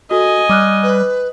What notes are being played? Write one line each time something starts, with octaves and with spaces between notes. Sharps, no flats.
F#4 A4 D#5 G#5
G3 D6 F6 F#6
B4